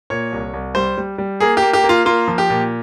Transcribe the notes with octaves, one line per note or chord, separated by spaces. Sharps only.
A#2 C#5
C2
C2
G3 C5
G3
G3
A#3 G#4
G4
A#3
G4
A#3
F4
A#3 F4
F3
G4
A#2